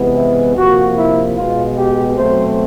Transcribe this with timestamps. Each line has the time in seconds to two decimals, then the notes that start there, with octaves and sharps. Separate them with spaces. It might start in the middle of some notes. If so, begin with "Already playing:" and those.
Already playing: C3 E3 G#3 B3
0.17 E4
0.56 C3 F3 A#3 F#4
0.97 E4
1.37 B2 G#3 B3 F4
1.78 G4
2.17 B2 F#3 A3 C4 C5